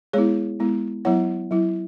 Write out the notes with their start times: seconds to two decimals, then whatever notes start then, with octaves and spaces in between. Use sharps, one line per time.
0.13 G#3 B3 E4 G#4 C#5
0.60 G#3 B3 E4
1.05 F#3 B3 E4 C#5 F#5
1.51 F#3 E4